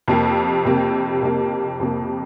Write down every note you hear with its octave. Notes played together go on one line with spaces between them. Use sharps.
F2 C3 A#3 G4
F2 C3 A#3 G4
F2 C3 A#3 G4
F2 C3 A#3 G4